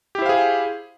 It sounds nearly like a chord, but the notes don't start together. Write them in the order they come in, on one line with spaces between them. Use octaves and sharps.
G4 E4 C5 F5 G#4